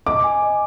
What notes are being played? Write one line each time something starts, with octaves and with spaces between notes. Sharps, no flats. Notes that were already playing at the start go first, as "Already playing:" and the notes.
D#5 D6
G#5
D#5